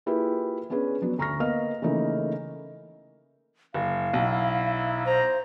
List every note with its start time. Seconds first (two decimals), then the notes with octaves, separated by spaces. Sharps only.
0.06 A#3 E4 F4 G4 G#4 B4
0.70 B3 C#4 D4 G#4 B4
1.02 F#3 B3 D4
1.18 D2 A#5 C#6 F6 A#6
1.40 A#3 B3 B4 D#5 F5 F6
1.82 C#3 E3 A3 A#3 D#4
3.74 F#1 F5
4.13 B1 E4
5.06 C5 A#5